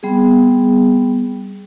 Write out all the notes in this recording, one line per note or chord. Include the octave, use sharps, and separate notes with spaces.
G3 B3 C4 G#4